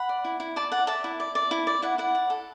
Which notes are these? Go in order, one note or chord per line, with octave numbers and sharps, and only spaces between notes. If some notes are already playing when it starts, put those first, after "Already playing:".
Already playing: F#5 B5
D5
E4
E4
D5 A5 D6
D5 F#5
D5 E5 A5
E4
D5
D5
E4
D5
E4 F#5
E4 F#5
D5
A4